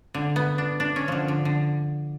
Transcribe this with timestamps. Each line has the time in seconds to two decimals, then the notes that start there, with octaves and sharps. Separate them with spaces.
0.14 D3
0.36 B3
0.58 D4
0.80 D4
0.96 C#4
1.08 D3 F3
1.28 D3
1.45 D3